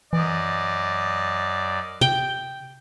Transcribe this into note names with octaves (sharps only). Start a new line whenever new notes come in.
F#2 E3 D5 D#5
C3 G5